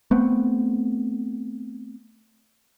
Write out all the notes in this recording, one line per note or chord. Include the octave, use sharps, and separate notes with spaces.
A3 B3 C4